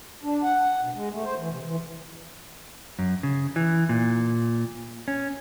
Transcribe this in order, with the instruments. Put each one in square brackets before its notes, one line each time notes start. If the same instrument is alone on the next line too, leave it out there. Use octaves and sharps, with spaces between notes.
[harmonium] D4
F#5
B2
G#3
A3
C5
E3
C3
E3
[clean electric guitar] F#2
C#3
E3
A#2
C#4